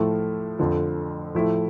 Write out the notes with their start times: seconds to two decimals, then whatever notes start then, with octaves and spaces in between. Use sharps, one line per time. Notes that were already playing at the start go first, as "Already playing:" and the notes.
Already playing: A2 F3 A3 E4
0.59 F2 D3 F3
1.35 A2 F3 A3 E4